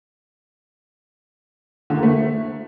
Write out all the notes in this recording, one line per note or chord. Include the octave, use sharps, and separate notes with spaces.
D3
A#3
A3